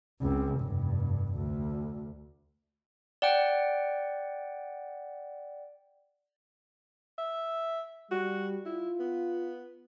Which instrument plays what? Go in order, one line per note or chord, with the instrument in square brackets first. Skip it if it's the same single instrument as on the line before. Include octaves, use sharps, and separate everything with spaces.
[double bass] C#2 C4
F1 G2
D2
[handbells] D5 F#5 G5
[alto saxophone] E5
[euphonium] G3 [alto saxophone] F#4
[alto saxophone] E4 [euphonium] F4
[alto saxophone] B3